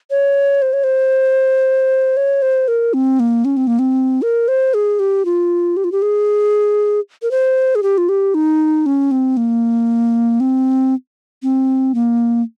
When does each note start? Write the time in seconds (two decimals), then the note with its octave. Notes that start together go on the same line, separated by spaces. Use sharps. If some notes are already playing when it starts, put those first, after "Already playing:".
0.11 C#5
0.62 C5
0.73 C#5
0.84 C5
2.17 C#5
2.42 C5
2.68 A#4
2.94 C4
3.20 A#3
3.45 C#4
3.57 C4
3.67 A#3
3.79 C4
4.22 A#4
4.48 C5
4.74 G#4
4.99 G4
5.25 F4
5.77 G4
5.84 F4
5.92 G4
6.02 G#4
7.22 A#4
7.31 C5
7.75 G#4
7.83 G4
7.98 F4
8.09 G4
8.34 D#4
8.86 C#4
9.11 C4
9.37 A#3
10.40 C4
11.43 C4
11.95 A#3